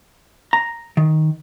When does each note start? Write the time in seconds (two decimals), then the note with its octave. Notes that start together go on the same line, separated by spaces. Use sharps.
0.53 A#5
0.97 D#3